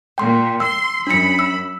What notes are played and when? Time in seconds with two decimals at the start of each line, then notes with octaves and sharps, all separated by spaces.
0.18 A#2 G5 C6
0.60 C6 E6
1.07 F#2 D4 B5 C#7
1.39 E6